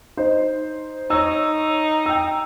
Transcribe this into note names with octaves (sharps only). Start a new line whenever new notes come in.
D#4 C5
D#4 C#5 E6
G5 E6